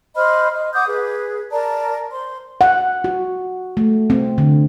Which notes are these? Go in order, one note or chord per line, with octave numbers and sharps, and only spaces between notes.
C5 D#5 B5 F6
D#5
F#5 D6 D#6 G6
G#4 B4
A#4 D5 A5 A#5
C5 C6
F#5
F#4
A3
C4
D3